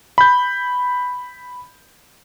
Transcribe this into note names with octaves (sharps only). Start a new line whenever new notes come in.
B5 G6